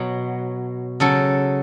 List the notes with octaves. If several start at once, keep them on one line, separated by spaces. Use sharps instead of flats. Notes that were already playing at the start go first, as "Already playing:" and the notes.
Already playing: B2 F#3
C#3 F#3 A4